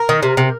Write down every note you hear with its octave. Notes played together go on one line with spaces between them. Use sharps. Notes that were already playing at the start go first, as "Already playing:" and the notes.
Already playing: A#4
D#3
C3
C3